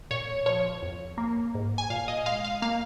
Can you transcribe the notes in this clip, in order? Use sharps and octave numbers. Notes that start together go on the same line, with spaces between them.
A#2 C#5
F3 C#5
F2
A#3
G#2
G#5
A#2 F5
D#5
G#3 F5
F5
A#3 F5